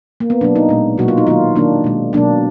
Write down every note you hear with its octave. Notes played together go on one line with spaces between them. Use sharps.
A#3
B3
B2 F#3 A#3 D4
D#4
A#2 G#3
B2 F#3 A#3 F#4
F4
D#4
D#3 F#3 A#3 F4
D#3 A#3 D4
B2 G#3
B2 F#3 A#3 D4